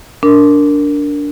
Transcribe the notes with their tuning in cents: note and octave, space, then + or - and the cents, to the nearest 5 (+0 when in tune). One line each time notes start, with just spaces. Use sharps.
D4 -15 A#4 -10